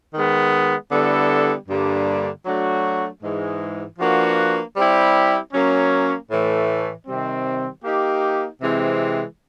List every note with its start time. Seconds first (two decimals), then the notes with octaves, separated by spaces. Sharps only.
0.14 D#3 G#3 B3
0.92 D3 G3 B3 E4 A4
1.69 G2 D3 G3 A#3 D4
2.46 F#3 A3 D4 F#4
3.23 G#2 E3 G#3
3.99 F3 A#3 D4 F#4 B4
4.77 G3 C4 E4 G4
5.54 F#3 A#3 C#4
6.31 A2 E3 A3
7.08 C3 D#3 G3 C4
7.84 A#3 D#4 G4
8.62 C3 E3 G#3 C4